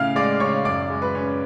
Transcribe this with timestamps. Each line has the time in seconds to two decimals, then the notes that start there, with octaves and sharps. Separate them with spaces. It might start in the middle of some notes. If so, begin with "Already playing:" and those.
Already playing: A2 C#3 F5 F6
0.16 G#3 D5 D6
0.40 C#3 C#5 C#6
0.65 F#2 D5 D6
0.90 G#3
1.02 B4 B5
1.15 C#4